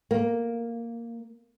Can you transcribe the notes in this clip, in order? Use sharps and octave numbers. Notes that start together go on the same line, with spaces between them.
A#3